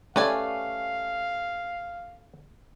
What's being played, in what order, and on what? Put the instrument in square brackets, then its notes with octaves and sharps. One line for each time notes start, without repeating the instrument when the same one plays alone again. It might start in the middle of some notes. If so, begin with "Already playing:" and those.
[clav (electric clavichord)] A3 C#4 G4 [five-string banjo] B4 D5 G#5 [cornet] F5